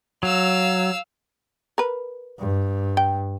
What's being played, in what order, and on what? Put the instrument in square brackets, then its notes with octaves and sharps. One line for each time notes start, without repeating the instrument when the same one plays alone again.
[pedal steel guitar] F#3 [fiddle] F5 E6
[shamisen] A#4 B4
[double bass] G2
[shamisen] G5